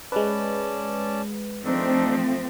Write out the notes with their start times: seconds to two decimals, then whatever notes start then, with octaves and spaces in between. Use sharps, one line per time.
0.12 G#3 C#4 B4 D5 A5
1.65 F3 A3 C4 D4 D#4 A4